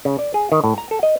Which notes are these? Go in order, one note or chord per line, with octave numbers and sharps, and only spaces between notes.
C#3
D5
G#4
D#3
A2
A#5
A4
D#5